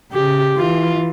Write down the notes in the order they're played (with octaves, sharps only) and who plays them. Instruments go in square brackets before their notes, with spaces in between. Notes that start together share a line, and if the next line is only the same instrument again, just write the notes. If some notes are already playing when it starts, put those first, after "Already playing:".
[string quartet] C#3 [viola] G4
[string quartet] E3 [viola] F4